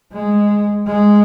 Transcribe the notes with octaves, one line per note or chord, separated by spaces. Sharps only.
G#3
G#3